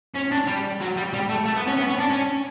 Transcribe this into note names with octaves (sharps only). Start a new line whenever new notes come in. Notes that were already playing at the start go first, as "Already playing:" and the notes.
C#4
D4
G3
F#3
G3
G3
A3
A3
B3
C#4
B3
C#4
D4
C#4